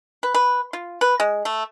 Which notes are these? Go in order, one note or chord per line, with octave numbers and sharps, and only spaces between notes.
B4
B4
F4
B4
G#3
A3